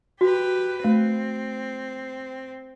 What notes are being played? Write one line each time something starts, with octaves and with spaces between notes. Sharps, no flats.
F#4 G4 B4
A3 C4